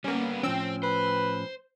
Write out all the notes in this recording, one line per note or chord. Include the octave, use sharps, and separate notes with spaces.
G3 A#3 B3 C#4
A2 F3 C4 C#4 C5 G5 E6
B4 C5